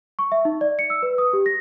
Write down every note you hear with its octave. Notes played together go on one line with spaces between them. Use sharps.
C#6
E5
D#4
D5
C#7
E6
B4
D#6
G4
A#6